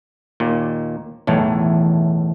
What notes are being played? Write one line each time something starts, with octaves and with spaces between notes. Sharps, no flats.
D#2 A#2
B1 E2 A2 E3